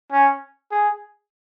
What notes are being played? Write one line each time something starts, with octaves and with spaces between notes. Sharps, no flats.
C#4
G#4